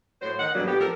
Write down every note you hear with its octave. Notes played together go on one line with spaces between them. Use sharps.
A2 F#3 C5
D#3 F#5
G2 A#2 D3 F#3 B3
A2 B3 G4
F3 A4 A#4